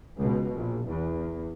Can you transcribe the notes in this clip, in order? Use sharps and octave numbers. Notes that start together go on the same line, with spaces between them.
C#2 B2
A#1
E2